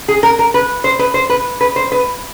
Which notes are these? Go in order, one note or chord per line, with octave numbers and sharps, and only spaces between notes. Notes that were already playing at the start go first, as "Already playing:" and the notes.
G#4
A#4
A#4
B4
C5
B4
C5
B4
B4
C5
B4